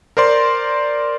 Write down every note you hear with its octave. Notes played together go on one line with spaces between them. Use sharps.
A#4 C5 D5 C6